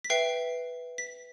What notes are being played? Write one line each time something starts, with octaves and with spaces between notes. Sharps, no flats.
B6
B4 E5 G5 C7
B6